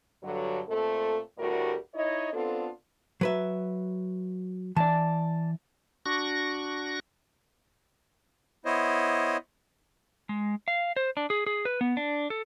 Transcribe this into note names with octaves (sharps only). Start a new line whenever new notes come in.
G2 D3 F#3
A#2 A3 C4 A4
D2 A2 G3 F#4 G4 A#4
D#4 E4 C#5 D#5
B3 C4 D4 F4 A4
F#3 B4 E5
E3 D5 A5
D4 F#4 C#6 A#6
B3 E4 C5 C#5 D#5
G#3
F5
C5
D4
G#4
G#4
B4
B3
D4
A4